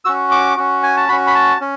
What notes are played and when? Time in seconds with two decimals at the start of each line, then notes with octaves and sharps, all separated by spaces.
0.05 C#4 F#4 E6
0.31 D6
0.57 C#4 F#4
0.83 G#5
0.97 A5
1.09 C#4 F#4 B5
1.27 B5
1.35 A5
1.61 C#4